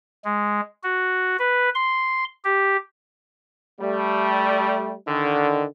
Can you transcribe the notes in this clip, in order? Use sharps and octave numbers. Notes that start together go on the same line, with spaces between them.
G#3
F#4
B4
C6
G4
G3 A3
D3 D#3